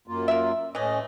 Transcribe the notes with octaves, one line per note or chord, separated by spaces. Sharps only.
F#2 A#3 F4
A#4 E5
A2 E3 A3 C#4 D#5